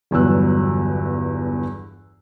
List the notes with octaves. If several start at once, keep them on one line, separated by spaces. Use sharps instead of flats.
G1 E2 G2 F#3 E6 F#6